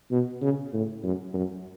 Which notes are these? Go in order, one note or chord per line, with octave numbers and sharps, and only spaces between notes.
B2
C#3
A2
F#2
F#2